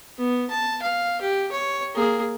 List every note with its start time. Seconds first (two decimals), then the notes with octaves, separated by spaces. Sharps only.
0.18 B3
0.50 A5
0.82 F5
1.21 G4
1.51 C#5
1.95 A#3 G#4